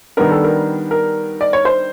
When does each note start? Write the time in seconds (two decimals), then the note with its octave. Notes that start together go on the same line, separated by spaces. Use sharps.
0.17 D#3 G3 B3 D4 A#4
0.31 A4
0.44 A#4
0.91 A#4
1.41 D5
1.53 C#5
1.65 C5